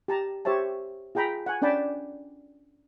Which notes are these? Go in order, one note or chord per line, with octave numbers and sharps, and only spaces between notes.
G4 A5 A#5
G4 C5 C#5 E5 A5
F4 G#4 G5 A#5 B5
F#5 G#5
C#4 D4 D5 G5 A5 B5